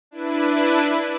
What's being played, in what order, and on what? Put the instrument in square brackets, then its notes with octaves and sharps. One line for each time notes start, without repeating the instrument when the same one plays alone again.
[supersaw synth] D4 E4 B4